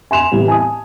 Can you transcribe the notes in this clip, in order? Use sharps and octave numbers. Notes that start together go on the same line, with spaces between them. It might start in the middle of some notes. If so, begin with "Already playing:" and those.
G#5 C6 E7 F7
A2 E3 G3
G#5 A5 D#6